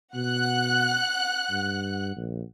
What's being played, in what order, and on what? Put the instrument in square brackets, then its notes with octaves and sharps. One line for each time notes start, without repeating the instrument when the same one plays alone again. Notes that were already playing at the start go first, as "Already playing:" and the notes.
[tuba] B2 [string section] F#5 F#6
[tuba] G2
A#1